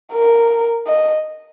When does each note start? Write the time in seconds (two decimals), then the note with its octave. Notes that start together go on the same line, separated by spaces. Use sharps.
0.13 A#4
0.87 D#5